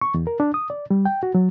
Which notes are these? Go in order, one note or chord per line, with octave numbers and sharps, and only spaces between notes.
C#6
E2
A#4
D4
D#6
D5
G3
G5
F#4
F#3